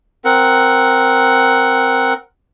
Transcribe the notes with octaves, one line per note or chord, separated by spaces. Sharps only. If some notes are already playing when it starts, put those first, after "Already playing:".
C4 A#4 F#5